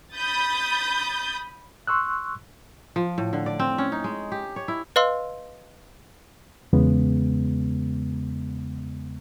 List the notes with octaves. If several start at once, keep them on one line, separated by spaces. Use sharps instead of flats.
B5 D#6 G6 A6
C6 C#6 E6 F#6
F3
A2
D3
D5
C4
C#4
D#4
G#3
G4
C#5
E4
B4 D#5 F5 C6 E6
E2 C#3 G#3 B3